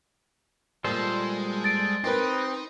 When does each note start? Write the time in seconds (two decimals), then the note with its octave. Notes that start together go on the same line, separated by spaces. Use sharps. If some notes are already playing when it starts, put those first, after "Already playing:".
0.84 A#2 G3 G#3 F4 A4 C5
1.64 A6 D7
2.04 C4 D#4 G4 A#4 B4